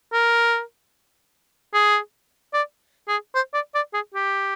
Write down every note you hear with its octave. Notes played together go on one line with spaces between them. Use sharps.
A#4
G#4
D5
G#4
C5
D5
D5
G#4
G4